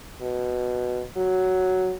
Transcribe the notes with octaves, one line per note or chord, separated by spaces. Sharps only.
B2
F#3